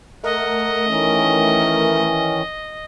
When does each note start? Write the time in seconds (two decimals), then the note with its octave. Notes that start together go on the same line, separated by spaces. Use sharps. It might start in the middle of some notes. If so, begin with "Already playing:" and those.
0.24 A3 A#4 D#5 F#5
0.87 D#3 E3 C#4